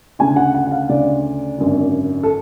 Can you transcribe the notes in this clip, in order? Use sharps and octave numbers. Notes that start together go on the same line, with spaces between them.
D2 C#3 G#5
F#5
F#5
F#5
F5
D2 C#3 D5
G#1 F#2 D3
A4